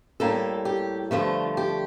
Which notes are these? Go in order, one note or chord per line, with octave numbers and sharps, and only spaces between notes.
A2 G3 A#3 A4
G4
G2 D3 F3 A3 F4
G4